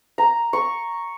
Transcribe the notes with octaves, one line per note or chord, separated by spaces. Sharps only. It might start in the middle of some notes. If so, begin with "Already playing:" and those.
A#5
C#6